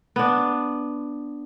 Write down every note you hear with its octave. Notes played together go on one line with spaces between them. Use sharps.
B3 D4